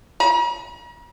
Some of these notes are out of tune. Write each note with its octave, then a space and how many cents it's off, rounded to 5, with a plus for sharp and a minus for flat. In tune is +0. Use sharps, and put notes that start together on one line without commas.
A#5 +45